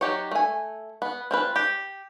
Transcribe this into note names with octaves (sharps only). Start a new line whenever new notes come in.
F#3 D#4 G4 C#5
A3 G#5
B3
C4 F4 B4
G4